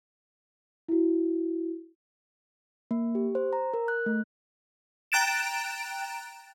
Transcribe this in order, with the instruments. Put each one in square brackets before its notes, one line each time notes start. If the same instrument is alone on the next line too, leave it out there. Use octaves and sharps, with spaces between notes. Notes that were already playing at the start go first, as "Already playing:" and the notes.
[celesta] E4 F#4
[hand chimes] A#3
G4
C5
A#5
A#4
F#6
A3
[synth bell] G5 A#5 F#6 A6 D7 E7